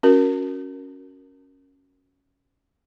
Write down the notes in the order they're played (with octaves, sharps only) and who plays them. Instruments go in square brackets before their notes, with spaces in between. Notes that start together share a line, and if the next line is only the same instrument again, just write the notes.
[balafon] C#4 F#4 A#4